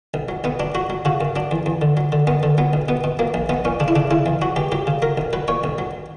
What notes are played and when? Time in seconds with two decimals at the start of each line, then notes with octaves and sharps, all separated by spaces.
0.14 B1
0.29 F#3
0.44 B1 B3
0.60 F#3 D4
0.75 F#3 F#4
0.90 F#3
1.05 C#3 F#4
1.21 F#2
1.36 F#3 D4
1.51 E2
1.66 E2
1.82 D3
1.97 F#3
2.12 D3
2.27 F#2 B3
2.43 D3
2.58 F#3 B3
2.73 B1
2.88 B2 B3
3.04 B2
3.19 F#3 A#3
3.34 A#1
3.49 A#1 B3
3.65 A#2 C#4
3.80 C#3 D4
3.88 E4
3.96 C#3 D4
4.11 C#3 E4
4.26 E2
4.42 F#3 F#4
4.56 C#2 G4
4.72 F#3 G4
4.87 C#3
5.02 F#3 A#4
5.18 B1
5.33 F#3 B4
5.48 A#2 C#5
5.64 B1
5.78 F#3